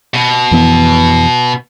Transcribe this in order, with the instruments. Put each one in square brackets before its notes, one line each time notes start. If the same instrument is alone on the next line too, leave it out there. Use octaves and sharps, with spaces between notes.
[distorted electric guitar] B2
[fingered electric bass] F2 E3 B3